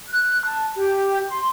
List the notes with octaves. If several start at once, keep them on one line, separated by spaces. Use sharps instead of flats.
F#6
A5
G4
C6